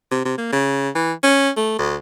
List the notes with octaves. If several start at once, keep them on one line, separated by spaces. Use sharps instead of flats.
C3
C3
A#3
C#3
E3
C#4
A3
D2